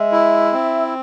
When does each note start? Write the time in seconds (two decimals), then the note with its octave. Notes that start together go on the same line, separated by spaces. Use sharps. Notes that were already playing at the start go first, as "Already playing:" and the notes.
Already playing: G#3 E5
0.12 E4
0.53 C4